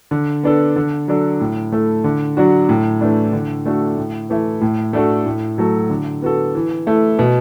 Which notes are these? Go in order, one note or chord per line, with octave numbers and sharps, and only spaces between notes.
D3
B3 D4 A4
D3
F#3 D4 A4
A2
A3 E4 A4
D3
F#3 D4 F#4
A2
E3 A3 D4
D3
A3 D4 F#4 A4
A2
E3 A3 E4
A2
A3 D4 F#4 A4
A2
F#3 A3 F#4 A4
D3
B3 F#4 A4
E3
A3 E4 A4
B2